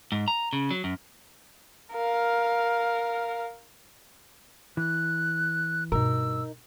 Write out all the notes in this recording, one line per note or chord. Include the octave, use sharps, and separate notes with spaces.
G#2
A#5
C#3
F#3
F#2
A#4 F5
E3 F#6
G2 B2 D#4 A#4 E6